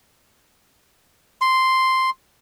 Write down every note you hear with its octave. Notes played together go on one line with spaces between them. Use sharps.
C6